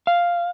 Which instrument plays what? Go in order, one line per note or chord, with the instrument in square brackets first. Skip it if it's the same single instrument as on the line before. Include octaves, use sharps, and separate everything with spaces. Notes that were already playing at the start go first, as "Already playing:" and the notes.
[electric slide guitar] F5